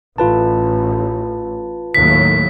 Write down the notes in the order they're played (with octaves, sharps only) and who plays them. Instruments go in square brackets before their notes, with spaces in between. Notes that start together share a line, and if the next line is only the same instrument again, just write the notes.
[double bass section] A1 [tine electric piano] F4 B4 A5
[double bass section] D#2 A2 F#3 [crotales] B6